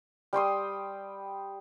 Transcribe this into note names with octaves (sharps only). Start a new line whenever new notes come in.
G3 G5 C6 D#6